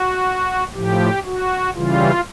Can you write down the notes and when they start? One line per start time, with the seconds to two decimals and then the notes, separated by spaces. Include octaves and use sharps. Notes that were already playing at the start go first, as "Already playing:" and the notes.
Already playing: F#4
0.74 A2 F3 G4
1.25 F#4
1.75 C#3 E3 G3 F4